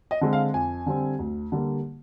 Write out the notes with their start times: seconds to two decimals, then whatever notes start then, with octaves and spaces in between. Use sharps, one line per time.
0.11 D#5
0.21 D3 G#3 C4
0.33 F5
0.54 F2 G#5
0.86 D3 G3 C4
1.19 D2
1.52 D3 G3 A#3